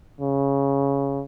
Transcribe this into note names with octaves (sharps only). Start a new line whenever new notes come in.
C#3